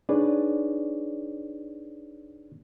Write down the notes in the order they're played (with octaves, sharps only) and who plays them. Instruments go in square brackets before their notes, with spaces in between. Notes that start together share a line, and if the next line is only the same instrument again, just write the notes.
[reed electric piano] D4 D#4 G#4 B4 C#5 D5